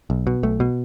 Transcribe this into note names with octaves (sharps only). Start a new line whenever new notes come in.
B1
B2
B1 A3
B2